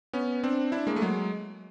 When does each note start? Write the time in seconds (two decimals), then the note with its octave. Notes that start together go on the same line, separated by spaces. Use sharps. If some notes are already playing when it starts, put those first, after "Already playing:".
0.13 B3 C#4
0.44 C4 D4
0.72 D4 E4
0.87 G#3 A#3
0.96 A3
1.02 F#3 G#3